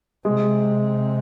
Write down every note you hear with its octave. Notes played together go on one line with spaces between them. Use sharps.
C3 G#3